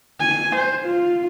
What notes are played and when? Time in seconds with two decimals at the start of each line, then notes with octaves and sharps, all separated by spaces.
0.21 G#5
0.56 C5
0.86 F4